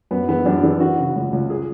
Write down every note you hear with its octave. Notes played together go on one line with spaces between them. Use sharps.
F#2 B3
E3 B3
F#2 D4
E3 D4
E3 F#4
C#3
C#2
C#2
G#4